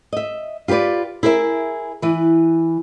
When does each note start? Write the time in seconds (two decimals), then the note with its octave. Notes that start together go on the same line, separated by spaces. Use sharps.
0.13 D#5 E5
0.68 F4 G4 A#4 B4 D5
1.23 E4 G#4 A#4 B4 E5
2.02 E3 B4